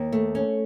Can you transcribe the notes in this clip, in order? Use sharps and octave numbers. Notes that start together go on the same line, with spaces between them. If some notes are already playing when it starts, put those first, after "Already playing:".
Already playing: D#2
A3
C#4